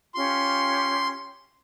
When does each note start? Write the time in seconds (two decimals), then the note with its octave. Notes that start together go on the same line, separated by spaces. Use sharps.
0.14 C#4 F4 G4 C6